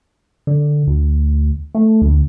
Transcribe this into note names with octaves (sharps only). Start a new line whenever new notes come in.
D3
D2
A3
D2